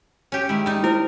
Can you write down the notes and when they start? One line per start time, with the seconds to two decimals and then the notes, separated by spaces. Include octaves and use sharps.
0.32 C#4 G4
0.49 D#3 G#3 E4
0.66 G3 D#4
0.84 E4 A#4 C5